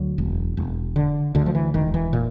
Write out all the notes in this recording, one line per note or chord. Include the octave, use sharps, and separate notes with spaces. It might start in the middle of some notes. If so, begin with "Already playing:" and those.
Already playing: D2 F#3
E1
E1
D3
D2 D3
F3
E3
E1 D#3
E3
A#2